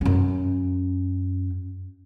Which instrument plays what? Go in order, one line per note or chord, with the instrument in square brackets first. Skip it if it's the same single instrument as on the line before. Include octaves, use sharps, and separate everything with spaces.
[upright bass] F#2 C#4